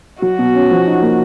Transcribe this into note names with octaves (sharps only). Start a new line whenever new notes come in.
F#3 F#4
B2
C#4
F3
D#4
A#3